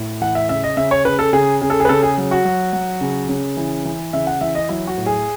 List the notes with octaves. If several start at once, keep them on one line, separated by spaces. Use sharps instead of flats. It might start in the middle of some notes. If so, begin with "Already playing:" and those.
Already playing: A2
E3 F#5
E5
C#3 E5
D#5
C#3 E5
C#5
C#3 B4
A4
C#3 G#4
C#3 G#4
A4
G#4
B4
C#3 A4
G#4
F#3
F#4
F#3
F#3
C#3
C#3
E3
E3
C#3 E5
F#5
E3 E5
D#5
F#3 E4
F#4
A2
G#4